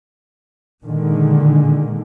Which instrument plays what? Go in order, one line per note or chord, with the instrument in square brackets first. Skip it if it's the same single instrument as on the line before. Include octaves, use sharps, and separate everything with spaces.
[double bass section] A#2 D3 D#3 G#3